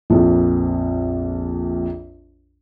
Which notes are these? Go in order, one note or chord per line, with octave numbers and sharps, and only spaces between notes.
A#1 F2